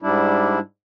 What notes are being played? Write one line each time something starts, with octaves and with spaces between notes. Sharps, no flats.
G#2 G3 D4 E4